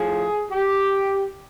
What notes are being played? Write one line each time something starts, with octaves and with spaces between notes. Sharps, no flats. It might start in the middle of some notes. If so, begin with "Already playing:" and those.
Already playing: A2 F3 G#4
G4